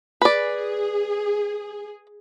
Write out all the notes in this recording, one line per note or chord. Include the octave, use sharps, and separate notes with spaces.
G#4 B4 D5